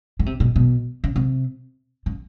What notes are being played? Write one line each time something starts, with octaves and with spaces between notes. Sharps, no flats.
C#3
C3
B2
B2
C#3
C3
C#3